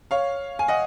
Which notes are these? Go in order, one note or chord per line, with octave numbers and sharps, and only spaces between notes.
C#5 F5
G#5
D#5 F#5